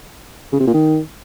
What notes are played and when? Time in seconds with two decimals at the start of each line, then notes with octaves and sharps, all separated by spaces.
0.53 C#3
0.60 C3
0.67 A#2
0.74 D#3